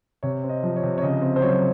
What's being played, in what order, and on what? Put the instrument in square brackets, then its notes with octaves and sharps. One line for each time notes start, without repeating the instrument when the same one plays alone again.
[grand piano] C3 C#5
C4
D#5
F3
C#5
C3
C#5
C#3 D#5
C4
C5
F#3 C#5